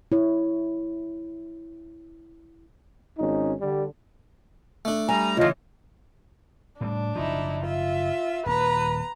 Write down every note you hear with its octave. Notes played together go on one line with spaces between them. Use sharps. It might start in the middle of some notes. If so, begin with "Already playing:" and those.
E4 C#5
G#1 C#4 D#4
D3 G3
A3 D4
G3 G#5 A#5
C#3 E3 F4 D#5
A2 F#3 G3 D4
F#1 F3 D#4 E4
F4 E5
D#1 A#3 B4 A#5